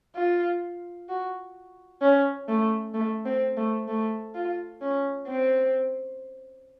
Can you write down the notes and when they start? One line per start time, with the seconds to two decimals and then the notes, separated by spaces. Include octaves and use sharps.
0.15 F4
1.09 F#4
2.02 C#4
2.48 A3
2.94 A3
3.25 C4
3.57 A3
3.88 A3
4.35 F4
4.81 C#4
5.27 C4